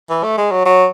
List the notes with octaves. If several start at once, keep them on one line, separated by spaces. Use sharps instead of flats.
E3
A3
G#3
F#3
F#3